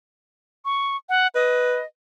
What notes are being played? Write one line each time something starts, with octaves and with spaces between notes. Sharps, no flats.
C#6
F#5
B4 D#5